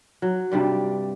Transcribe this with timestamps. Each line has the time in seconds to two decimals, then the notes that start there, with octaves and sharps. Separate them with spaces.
0.22 F#3
0.52 G2 C3 G3 D5